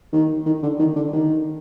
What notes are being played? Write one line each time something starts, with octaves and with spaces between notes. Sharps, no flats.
D#3
D#3
D3
D#3
D3
D#3